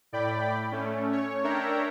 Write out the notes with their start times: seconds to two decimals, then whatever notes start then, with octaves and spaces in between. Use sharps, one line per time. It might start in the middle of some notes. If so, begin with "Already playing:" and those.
0.13 A2 D5 G5 B5
0.72 A3 C#4
1.12 C#5
1.44 D4 A#4 C#5 E5 G5 A#5